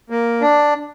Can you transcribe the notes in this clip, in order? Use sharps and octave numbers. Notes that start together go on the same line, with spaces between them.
A#3
D4